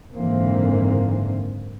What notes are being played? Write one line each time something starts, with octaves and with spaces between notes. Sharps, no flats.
F#1 G#2 D3 E3 A#3 C4